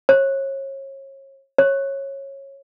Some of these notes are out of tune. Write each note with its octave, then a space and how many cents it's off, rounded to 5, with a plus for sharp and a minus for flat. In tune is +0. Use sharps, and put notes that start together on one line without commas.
C#5 -35
C#5 -20